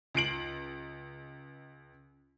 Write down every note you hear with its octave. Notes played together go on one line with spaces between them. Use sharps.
C#2 C7 D7 F#7